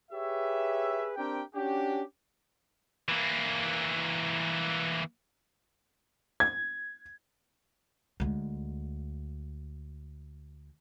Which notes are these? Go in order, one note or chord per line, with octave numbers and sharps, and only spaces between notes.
G4 G#4 B4 C#5 E5
C4 D4 G4 A#4 G5
C#4 D4 F#4 G4
E3 A#3
G#6
D2 G#3